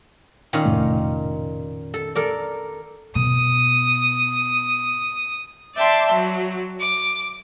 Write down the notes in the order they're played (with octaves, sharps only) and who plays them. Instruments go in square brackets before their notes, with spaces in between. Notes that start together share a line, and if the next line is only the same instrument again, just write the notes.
[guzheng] A#2 D#3 C#4
[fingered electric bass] F1 A2 A3
[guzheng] A4
A4 A#4 D5
[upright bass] B2 [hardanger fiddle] D#6
[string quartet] D5 E5 G5 A5 C6
F#3
D6